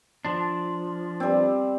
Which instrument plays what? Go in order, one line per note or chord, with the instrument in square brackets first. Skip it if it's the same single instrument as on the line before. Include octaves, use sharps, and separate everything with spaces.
[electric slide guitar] F3 D4
[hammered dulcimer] G3 C4